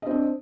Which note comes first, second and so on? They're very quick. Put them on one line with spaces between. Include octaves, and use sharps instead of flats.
D#5 C4 D4